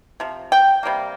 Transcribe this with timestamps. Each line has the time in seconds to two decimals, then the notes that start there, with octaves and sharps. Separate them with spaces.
0.20 C3 F3
0.52 G5
0.83 C3 G3 A#3